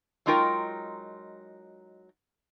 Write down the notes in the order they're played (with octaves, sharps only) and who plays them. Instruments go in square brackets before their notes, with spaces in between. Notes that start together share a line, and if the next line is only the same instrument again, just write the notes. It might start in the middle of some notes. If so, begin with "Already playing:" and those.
[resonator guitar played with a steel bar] F#3 G#3 D#4 F4 A#4 G5